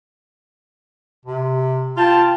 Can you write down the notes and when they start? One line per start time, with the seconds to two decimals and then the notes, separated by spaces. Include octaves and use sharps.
1.25 C3
1.97 F4 G5 A5